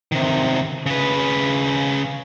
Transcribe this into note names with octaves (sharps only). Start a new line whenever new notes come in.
C3 D#3
C#3 B4